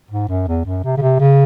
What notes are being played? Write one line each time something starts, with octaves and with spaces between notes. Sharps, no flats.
G#2
F#2
E2
F#2
C3
C#3
C3
C#3